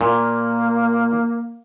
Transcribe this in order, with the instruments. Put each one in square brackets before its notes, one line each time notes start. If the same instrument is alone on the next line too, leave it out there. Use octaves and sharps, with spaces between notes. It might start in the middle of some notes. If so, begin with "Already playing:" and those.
[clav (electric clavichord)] A#2 [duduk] A#3